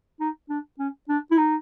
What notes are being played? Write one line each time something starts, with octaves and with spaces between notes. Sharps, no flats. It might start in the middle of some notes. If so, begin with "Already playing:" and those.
D#4
D4
C#4
D4
E4
D#4